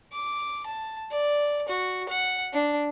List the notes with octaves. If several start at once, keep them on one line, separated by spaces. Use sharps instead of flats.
D6
A5
D5
F#4
F#5
D4